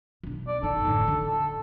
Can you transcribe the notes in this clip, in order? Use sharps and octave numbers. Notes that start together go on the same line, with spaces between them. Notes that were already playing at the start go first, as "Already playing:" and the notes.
B1 D4
D5
F#2 D#4 A4
A2 D3
D3
A4